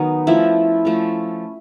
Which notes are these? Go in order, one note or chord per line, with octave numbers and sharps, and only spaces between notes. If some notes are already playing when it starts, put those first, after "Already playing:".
Already playing: D#3 F#3 B3 D#4
F3 A3 C#4 E4
F3 A3 C#4